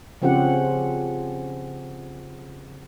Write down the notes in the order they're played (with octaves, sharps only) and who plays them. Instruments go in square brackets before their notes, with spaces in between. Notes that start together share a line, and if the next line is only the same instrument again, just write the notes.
[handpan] C#3 F3 C4 C#4 G4 F#5